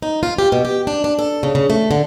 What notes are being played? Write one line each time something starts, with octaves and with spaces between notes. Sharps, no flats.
D#4
F4
G4
B2
G4
D4
D4
A4
C#3
C#3
A3
D3